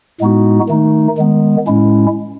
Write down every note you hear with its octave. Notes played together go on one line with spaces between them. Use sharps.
A2 G#3 B3 D#4 F#4
D#3 A3 D#4
D#3 G#3 B3
A2 G#3 C#4 E4